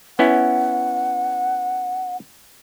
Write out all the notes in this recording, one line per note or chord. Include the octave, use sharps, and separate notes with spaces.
B3 C#4 E4 F#5